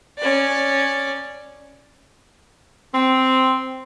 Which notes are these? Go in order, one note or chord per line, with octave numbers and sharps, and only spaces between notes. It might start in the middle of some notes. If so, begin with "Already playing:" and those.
C#4 D5
C4